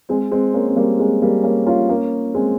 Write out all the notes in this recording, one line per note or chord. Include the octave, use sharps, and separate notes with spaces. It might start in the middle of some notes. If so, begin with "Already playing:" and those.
G#3 C4
G#3 C4
A#3 C#4
C4
G3 A#3
G#3 C4
G3 A#3
A#3 C#4
C#4 F4
A#3 C#4
G#3 C4